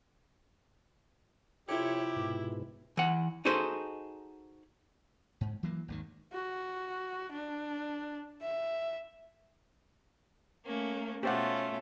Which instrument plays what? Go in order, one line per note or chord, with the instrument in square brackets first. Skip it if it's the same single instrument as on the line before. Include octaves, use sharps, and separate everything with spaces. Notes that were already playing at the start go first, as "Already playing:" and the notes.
[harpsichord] F2 C3 [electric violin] E4 [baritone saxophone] G4 [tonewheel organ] C#5
[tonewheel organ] G#2 B2
[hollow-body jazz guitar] E3 F#5
D#4 F#4 G#4 A4 C5
[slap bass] G#2
E3 F#3 A#3
G#1 D#2 D#3
[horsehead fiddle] F#4
D4
E5
[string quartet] A3 A#3 C#4
[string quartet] B2 C#4 F4 [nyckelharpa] A3 [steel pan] G4 C5 F#5